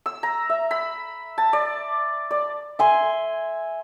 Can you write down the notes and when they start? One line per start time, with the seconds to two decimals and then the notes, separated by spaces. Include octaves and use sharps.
0.06 E6
0.23 A#5
0.50 E5
0.71 B5
1.38 A5
1.53 D5
2.31 D5
2.79 E5 G#5 C6